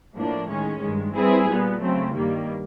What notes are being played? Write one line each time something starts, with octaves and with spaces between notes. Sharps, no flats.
A2 F3 A#3 D4
D#3 G#3 C#4
G2 D#3 G#3
G3 C4 E4 G#4 B4
A#2 G3 B3
C#3 F#3 A3 C4
G2 D#3 G3 A#3